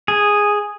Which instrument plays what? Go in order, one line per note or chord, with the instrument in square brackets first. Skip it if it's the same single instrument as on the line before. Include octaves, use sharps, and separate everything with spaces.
[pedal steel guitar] G#4